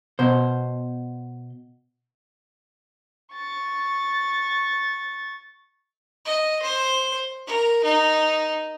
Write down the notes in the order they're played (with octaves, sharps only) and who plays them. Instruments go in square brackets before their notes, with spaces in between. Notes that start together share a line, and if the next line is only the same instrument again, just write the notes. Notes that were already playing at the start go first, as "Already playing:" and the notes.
[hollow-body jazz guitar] B2 C5
[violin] C#6 A6
[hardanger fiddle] D#5
C5
A#4
D#4